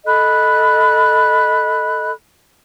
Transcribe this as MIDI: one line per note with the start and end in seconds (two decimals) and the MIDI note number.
0.06 2.11 69
0.06 2.11 75
0.06 2.11 83
0.06 2.11 90